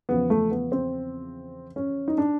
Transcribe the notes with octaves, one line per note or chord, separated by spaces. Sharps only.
E2 C#3 F3 B3
A3
B3
C4
C#4
D#4
D4